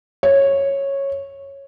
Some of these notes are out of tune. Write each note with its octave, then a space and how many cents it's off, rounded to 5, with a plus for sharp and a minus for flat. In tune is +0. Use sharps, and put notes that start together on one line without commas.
C#5 -10